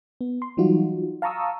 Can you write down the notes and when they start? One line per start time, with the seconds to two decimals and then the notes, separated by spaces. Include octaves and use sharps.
0.21 B3
0.42 C6
0.57 E3 F#3 G3 D#4 F4 F#4
1.22 F5 A5 A#5 C#6 D#6 E6